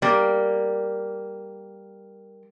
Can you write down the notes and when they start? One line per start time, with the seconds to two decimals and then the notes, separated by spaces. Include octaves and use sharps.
0.02 G3 A#3